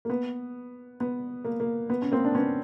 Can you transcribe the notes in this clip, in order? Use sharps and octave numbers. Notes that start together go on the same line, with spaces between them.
A#3
B3
B3
A#3
A#3
B3
C#4
A#3 C4
D4
B3 C#4